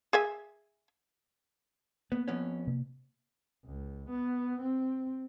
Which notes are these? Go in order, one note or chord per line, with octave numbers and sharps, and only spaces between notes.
G#4 E5 G#5
A#3 B3
F2 B3 C#4
C3 A#3
C#2
B3
C4